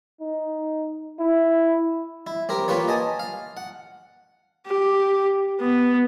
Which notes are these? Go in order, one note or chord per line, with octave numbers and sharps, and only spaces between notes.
D#4
E4
E4
C4 G4 A#4
A#3 F4 G4 B4 C#5
D#5 G#5 A5
F5
F#5
G4
B3